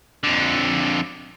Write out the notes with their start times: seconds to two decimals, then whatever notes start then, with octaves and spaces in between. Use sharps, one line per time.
0.23 F2 D3